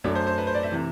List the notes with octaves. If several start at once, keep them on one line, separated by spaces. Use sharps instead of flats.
F#2 F#3 A3 D4
C5
C5
B4
C5
D5
E5
C3 E3